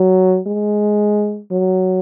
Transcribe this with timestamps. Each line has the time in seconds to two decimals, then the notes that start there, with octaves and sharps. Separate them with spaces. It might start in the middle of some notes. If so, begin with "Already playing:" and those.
Already playing: F#3
0.46 G#3
1.52 F#3